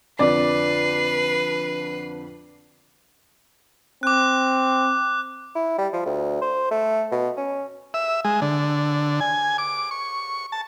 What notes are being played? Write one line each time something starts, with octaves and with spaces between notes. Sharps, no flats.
F2 D3 C4 B4 D5 C7
C4 D6 F#6
E4
G3
F3
D2
C5
A3
B2
C#4
E5
G#3
D3
G#5
D6
C#6
A5